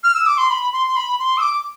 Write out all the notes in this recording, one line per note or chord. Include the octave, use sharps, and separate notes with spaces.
F6
E6
D6
C6
B5
C6
C6
B5
C6
E6
D6